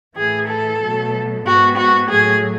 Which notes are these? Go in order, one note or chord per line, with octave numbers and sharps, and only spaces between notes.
A2 E3 A3 G#4
A4
B2 F#3 A3
G#2 G#3 B3 F#4
F#4
A2 F#3 A3 G#4